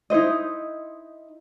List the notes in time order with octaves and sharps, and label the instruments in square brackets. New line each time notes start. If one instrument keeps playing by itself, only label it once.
[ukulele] D#4 E4 C5 D#5